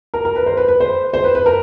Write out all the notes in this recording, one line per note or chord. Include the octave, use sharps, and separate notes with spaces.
A#4
A#4
B4
C5
B4
B4
C5
C5
B4
B4
A#4